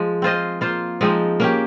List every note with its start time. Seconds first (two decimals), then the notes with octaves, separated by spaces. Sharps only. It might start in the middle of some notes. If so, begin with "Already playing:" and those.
Already playing: F3 G#3
0.22 C4 F4 C5 D#5
0.61 A#3 F4 C5
1.01 F3 G#3 C4 D#4
1.40 A#3 C#4 G4